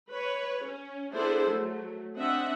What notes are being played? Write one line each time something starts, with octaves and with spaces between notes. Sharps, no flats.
B4 C#5
C#4
B3 D4 E4 G#4 A4 C5
F#3 A3
C4 D4 D#5 E5 F#5